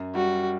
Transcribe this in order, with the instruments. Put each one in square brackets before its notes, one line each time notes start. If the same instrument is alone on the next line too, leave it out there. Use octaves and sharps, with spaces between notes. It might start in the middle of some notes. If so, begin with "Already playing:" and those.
Already playing: [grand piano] F#2
[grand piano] G3 [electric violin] F#4